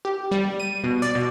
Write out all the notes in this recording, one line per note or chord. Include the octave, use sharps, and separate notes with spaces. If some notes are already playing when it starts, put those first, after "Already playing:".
G4
G3
D#7
B2
D5
B2